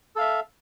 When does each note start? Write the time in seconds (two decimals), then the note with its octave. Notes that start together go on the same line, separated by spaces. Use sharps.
0.16 A4
0.18 F5
0.21 E5